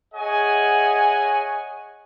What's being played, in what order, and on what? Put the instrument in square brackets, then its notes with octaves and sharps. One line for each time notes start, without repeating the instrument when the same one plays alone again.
[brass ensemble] G#4 C#5 D#5 E5 F#5 G#5